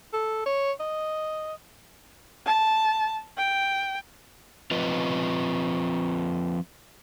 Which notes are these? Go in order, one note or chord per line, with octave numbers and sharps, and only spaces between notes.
A4
C#5
D#5
A5
G5
F3 C4 F4 B4 D#5